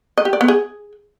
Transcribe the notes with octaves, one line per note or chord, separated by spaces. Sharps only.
D#5
G4
D5
B3
G#4